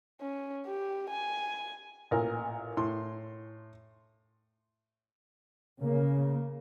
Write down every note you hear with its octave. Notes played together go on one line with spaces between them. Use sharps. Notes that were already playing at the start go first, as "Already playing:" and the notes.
C#4
G4
G#5
A1 A#2 A#4
A2 C6
C#3 A#3